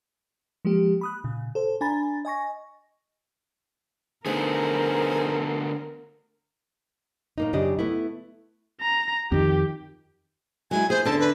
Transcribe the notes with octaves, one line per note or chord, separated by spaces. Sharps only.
F3 G#3 A#3 G4
B5 D#6 F#6
A#2 C#3
A4 C5
D4 G#5 A#5 B5 A6
D#5 G#5 C#6 A#6
D3 A3 B3 D#4 G#4 A#4 C5
A2 A#3 D#4
F#2 C#3 D4 G4 D#5
A3 B3 E4
A#5
F2 D#3 G4
F#3 G#3 E4 G#5
E4 G#4 C5
E2 D3 C#4 A5
B4